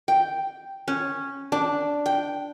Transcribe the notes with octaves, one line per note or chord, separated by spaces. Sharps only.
G5
C#4
D4
G5